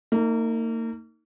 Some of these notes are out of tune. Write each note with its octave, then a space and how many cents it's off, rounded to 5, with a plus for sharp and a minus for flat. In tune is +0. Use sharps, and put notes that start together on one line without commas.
A#3 -35 D#4 +20